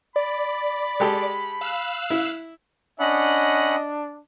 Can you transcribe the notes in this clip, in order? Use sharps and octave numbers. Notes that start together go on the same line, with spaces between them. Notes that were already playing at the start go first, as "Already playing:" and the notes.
D5 B5
G#3 G4 A4
F5 E6 F#6
E4
C#4 D4 D#5 F#5 B5